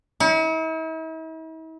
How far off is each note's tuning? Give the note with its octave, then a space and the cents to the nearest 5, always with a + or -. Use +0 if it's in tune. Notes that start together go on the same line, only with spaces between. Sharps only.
E4 -45